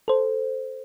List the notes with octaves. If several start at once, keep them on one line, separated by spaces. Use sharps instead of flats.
A4 C5